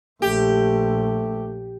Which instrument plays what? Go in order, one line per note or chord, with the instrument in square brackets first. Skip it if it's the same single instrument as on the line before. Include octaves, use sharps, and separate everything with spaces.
[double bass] A#1 [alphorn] A3 [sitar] G4